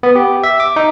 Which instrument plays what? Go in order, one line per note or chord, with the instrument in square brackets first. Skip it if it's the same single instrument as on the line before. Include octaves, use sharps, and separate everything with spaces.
[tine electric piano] B3
G4
E5
D6
D#4